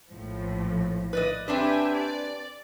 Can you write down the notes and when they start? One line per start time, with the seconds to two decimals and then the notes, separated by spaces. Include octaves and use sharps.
0.10 A#1 A2 F3
1.13 B4 D5 D#5
1.48 C4 D4 G4 B4 E5 G#5
1.96 D5